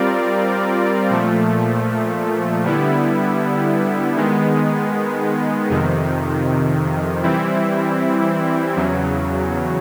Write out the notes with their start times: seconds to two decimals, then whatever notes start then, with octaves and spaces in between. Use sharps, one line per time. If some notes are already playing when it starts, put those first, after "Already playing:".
Already playing: G3 C4 F4 A#4 D5
1.10 A#2 F3 A3
2.64 D3 G3 B3 E4
4.16 D#3 G#3 B3
5.70 F2 C3 D#3
7.23 E3 G3 C4 E4
8.76 E2 C#3 F#3